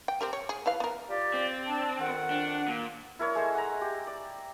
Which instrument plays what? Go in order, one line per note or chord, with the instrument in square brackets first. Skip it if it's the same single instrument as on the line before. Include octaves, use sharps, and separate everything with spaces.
[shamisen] G5
C4 G4 A#4
C#5
G#4
E4 B4 F5
B3 A#4
[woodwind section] F4 G4 D5
[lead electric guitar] C4
[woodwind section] D4 A5
F2 D#3 F#5
[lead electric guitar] D4
A#2
[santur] E4 A#4 C#5 D5
G#3 A3 C5 C#6
F#5 G#5 A#5
G4
D5